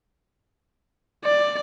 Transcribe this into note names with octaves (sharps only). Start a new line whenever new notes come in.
D5